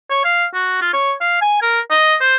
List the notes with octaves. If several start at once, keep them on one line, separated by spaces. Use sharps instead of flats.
C#5
F5
F#4
F4
C#5
F5
G#5
A#4
D#5
C5